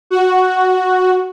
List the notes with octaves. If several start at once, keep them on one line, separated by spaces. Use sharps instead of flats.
F#4